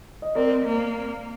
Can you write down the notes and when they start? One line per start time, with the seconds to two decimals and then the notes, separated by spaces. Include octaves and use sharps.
0.22 D#5
0.35 C4 A#4 D5
0.65 A#3